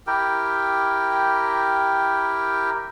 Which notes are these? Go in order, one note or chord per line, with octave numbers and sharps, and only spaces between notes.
E4 G4 A#4 G5